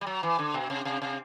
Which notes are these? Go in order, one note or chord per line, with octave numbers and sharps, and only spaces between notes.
G3
F#3
E3
D3
B2
C3
C3
C3